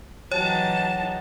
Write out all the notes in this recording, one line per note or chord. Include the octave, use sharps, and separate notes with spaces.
E3 F#3 D#4 G#4 C#5 F#5 G5 A5